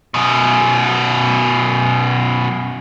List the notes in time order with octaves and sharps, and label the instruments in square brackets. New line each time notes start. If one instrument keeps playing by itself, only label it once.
[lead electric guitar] F#2 B2